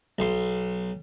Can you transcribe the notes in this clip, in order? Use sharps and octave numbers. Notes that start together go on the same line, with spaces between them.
B1 C6